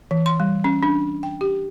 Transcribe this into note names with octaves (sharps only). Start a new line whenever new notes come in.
E3
C6
G3
C#4
D4
G5
G4